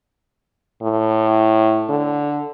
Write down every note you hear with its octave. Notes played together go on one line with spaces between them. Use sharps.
A2
D3